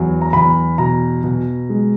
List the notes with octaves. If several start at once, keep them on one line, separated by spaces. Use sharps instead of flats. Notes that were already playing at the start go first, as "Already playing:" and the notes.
Already playing: E2 F#3
A#5
E2 B5
B2 A#5
B2
G#3